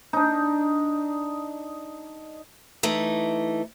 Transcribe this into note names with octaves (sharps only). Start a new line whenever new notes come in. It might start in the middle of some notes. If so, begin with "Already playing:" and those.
D4 D#4
E3 A3 D#4